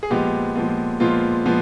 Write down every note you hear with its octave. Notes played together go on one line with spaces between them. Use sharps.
G#4
A#2 F3 G#3 B3 G4
A#2 F3 G#3 B3
A#2 F3 G#3 B3 F4
A#2 F3 G#3 B3